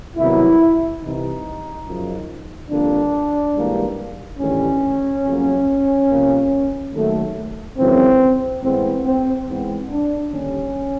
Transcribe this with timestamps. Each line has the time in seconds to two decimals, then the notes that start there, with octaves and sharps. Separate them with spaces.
0.17 C2 C3 D#3 F#3 B3 E4
1.01 C2 C3 E3 D#4
1.86 F#2 C#3 F3
2.71 F2 D3 G3 A#3 D4
3.55 G#2 E3 G3 A#3
4.39 A1 G2 D#3 G3 C#4
5.24 F2 C#3 F#3 A#3
6.08 C2 C3 F3 A#3
6.93 D#2 D#3 F#3 A3
7.77 G#1 F#2 C#3 E3 C4
8.62 A2 E3 G#3 B3 C4
9.05 C4
9.47 G#2 E3 G#3 B3 C4
9.89 D4
10.31 D#2 D3 G3 C#4